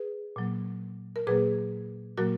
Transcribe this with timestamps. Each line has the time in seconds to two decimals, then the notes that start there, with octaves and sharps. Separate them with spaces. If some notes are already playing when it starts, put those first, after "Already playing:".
Already playing: G#4 B4
0.36 A#2 F#3 A#3
1.16 A#4
1.27 A#2 F#3 A#3 G#4 B4
2.18 A#2 F#3 A#3 F#4 A#4